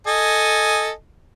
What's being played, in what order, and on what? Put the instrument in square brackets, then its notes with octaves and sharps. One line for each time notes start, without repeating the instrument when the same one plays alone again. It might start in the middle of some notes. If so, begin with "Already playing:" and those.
[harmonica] A4 D#5 G#5